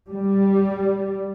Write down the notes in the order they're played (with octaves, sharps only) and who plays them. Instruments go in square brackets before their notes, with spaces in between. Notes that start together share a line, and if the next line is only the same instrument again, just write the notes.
[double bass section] G3